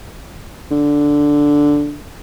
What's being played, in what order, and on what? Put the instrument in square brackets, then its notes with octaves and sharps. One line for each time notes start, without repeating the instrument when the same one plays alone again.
[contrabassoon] D3